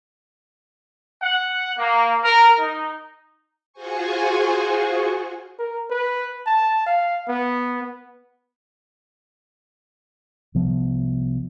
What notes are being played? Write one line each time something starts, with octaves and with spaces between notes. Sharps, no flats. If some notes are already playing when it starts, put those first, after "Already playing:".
F#5
A#3
A#4
D#4
F4 F#4 G#4 C5 G#5 C#6
A#4
B4
A5
F5
B3
C2 F3 B3